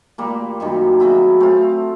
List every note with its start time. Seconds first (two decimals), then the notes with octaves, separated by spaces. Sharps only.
0.18 A#2 G3 A#3
0.60 F#2 D#3 G3
1.00 C#3 F#3 B3 E4
1.40 A3 C4 F4